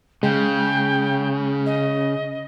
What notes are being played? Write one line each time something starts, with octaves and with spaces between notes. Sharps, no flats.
C#3 G#3 G5
D#5